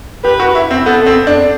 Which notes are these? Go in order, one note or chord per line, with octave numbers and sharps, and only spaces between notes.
G4 B4
F#4
E4
C4
B3 A4
C4
D4